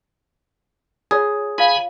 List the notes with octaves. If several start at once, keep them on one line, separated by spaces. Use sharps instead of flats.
F4 G#4 C#5
F4 F5 G#5 B5